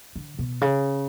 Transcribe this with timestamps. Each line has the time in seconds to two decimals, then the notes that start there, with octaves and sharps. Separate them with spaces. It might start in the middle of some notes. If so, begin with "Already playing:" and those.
0.16 D3
0.39 B2
0.61 C#3